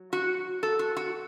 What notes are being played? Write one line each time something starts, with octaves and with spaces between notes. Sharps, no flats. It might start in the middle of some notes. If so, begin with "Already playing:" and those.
Already playing: F#3
F#4
A4
F#4
F#4